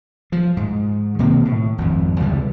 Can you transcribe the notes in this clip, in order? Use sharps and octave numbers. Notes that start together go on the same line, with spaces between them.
F3
G#2
B2 D#3 A#3 C4
A2
G#1 F2
C#2 C3 E3 G3